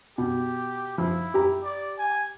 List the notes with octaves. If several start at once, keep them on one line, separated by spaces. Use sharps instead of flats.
B2 G4
F3 E4
G4 A#5
D5
G#5